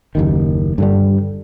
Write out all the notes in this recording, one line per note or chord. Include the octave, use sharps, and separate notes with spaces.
F#1 D#2 D#3
G2 D3 G3